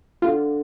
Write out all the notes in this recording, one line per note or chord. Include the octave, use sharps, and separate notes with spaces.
D3 F4